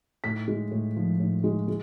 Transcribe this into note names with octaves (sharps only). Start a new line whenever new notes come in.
A2 B6
G#3
A2
F3
A2
G#3
G#3